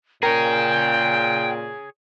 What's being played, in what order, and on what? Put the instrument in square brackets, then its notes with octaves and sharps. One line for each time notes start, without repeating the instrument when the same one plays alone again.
[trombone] A#2 [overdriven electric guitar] G#4 C#5 [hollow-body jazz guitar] A#4 [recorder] G5